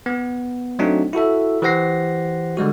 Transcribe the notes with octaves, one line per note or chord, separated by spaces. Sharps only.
B3
F#3 A3 C4 D4 D#4 F#4
E4 F#4 A4 E5
E3 G4 C5 F#5 A#6 C7
D3 G3 G#3 F#4